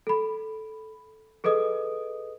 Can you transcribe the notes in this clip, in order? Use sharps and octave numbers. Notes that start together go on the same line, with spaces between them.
A4 B5
G#4 A4 B4 D#5 D#6